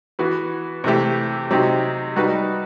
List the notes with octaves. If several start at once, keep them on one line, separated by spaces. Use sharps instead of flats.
E3 B3 F#4 B4
C3 E3 A3 E4 G4
C3 F#3 C4 D#4 G4
G3 D#4 F#4 B4